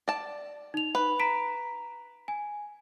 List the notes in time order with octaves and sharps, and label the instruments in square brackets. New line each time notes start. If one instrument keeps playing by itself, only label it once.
[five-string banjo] D5 A5
[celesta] D#4 F7
[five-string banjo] B4
[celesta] A#5 B6 D7
G#5